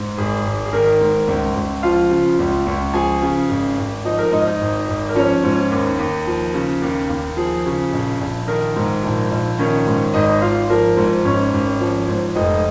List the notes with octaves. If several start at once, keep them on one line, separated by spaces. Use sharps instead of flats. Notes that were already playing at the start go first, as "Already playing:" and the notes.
Already playing: G#2
G#1 G#4
G#1
G#4
D#3 A#4
G#2
C#2
C#2
F3 F4 F5
C#3
C#2
C#2
F3 G#4 G#5
C#3
G#1
G#1
F3 D#4 D#5
A#4
G#2 D#4 D#5
D#4 D#5
G#1
G#1
A#4
F3 C#4 C#5
G#2
D#2
D#2
F3
C#3
D#2
D#2
F3 G#4
C#3
A#1
A#1
D#3 A#4
G#2
A#1
A#1
D#3 C#4 C#5
G#2
G#1 D#4 D#5
G#1 F4 F5
F3 A#4
G#2
G#1 C#4 C#5
G#1
F3
G#2
F1 D#4 D#5